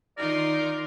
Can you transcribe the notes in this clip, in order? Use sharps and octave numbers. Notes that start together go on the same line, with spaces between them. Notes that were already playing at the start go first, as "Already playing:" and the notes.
D#3 D#4 F4 A#4 D5 C6